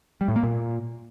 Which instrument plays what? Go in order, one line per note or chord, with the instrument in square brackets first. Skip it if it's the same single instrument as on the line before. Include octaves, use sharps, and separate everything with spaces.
[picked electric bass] G3
A2
A#3
A#2